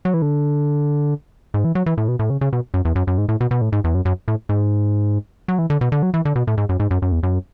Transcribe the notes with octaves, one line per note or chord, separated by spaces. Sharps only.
F#3
E3
D3
G#2
E3
F#3
E3
A2
B2
A2
C#3
C#3
B2
F#2
E2
F#2
F#2
G#2
A2
B2
B2
A2
G#2
E2
F#2
F#2
A2
G#2
F#3
E3
D3
B2
D3
F#3
E3
D3
B2
A2
G#2
F#2
G#2
F#2
F#2
E2
F#2